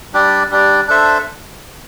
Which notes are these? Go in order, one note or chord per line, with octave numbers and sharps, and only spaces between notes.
G3 D4 G4 D5
G3 D4 G4 D5
D4 A4 C5 E5